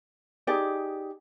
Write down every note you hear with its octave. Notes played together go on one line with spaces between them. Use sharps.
D#4 G4 G#4 D5